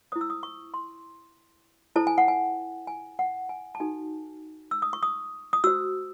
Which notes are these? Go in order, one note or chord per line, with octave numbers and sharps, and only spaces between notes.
E4 C5 D#6
E6
D#6
C#6
C6
E4 A4 C5 A5
G#5
F#5
G#5
G#5
F#5
G#5
A5
D#4 F#4 A4 G#5
E6
D#6
C#6
D#6
D#6
F#4 C5 E6